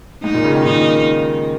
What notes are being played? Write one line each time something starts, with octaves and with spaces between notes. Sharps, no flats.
G#2 D#4
A#2
C#3
D#3
A#2 D#4